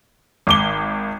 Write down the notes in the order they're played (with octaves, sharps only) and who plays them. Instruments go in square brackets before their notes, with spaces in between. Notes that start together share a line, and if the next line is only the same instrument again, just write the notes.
[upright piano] G#1 D6 G7